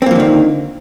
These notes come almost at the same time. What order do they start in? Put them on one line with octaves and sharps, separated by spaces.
C4 A#3 F3 D3 D#3